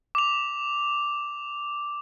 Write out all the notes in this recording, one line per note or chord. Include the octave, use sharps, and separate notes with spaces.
D6 F7